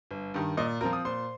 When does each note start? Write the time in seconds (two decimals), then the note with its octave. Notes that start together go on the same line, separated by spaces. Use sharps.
0.11 G1
0.34 G2 D#3
0.57 A#2 D#5 D#6
0.80 F3 C4 F4 A#4 A#5
0.93 D#6
1.05 A#2 C5 C6